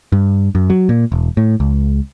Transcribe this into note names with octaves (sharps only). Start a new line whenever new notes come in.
G2
F#2
F#3
A#2
E1
A2
C#2